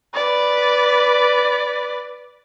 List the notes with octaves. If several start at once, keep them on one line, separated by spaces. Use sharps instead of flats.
B4 D5